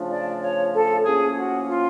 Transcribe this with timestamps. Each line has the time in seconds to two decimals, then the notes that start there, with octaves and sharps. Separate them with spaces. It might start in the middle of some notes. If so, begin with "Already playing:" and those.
Already playing: C#3 F3 A3 D4
0.11 D5
0.41 C#5
0.73 A4
1.05 A2 F3 A#3 C#4 G#4
1.36 F#4
1.68 F4